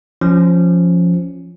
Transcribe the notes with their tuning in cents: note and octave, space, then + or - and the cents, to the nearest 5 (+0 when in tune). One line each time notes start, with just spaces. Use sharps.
F3 +0 C#4 +0